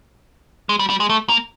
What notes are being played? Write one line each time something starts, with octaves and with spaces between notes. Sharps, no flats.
G#3
G3
G3
G#3
A3
A#3